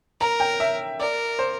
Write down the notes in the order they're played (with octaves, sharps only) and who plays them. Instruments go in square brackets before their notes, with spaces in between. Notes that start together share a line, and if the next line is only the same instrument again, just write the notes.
[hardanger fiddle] A#4 [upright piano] A#5
[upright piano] G5
E5
[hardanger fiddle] A#4 [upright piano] D5
[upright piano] C5